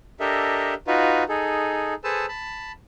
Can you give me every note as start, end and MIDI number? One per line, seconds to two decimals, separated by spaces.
0.20 0.74 62
0.20 0.74 67
0.20 0.74 69
0.20 0.74 70
0.20 0.74 75
0.20 0.74 76
0.87 1.24 63
0.87 1.24 65
0.87 1.24 66
0.87 1.24 71
1.29 1.94 63
1.29 1.94 68
1.29 1.94 69
2.04 2.26 68
2.04 2.26 69
2.04 2.26 71
2.04 2.26 72
2.04 2.26 81
2.04 2.26 88
2.28 2.72 81
2.28 2.72 83